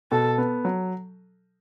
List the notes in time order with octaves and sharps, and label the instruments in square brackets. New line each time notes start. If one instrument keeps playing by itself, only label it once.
[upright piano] B2 [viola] A4
[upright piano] B3
F#3